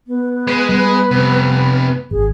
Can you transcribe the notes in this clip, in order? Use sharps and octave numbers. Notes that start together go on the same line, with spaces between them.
B3
G#3 B4
G3 G#3
F2 C3
G#1 G#4